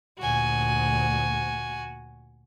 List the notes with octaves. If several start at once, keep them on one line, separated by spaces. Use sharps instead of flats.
D2 A#2 F#4 G#5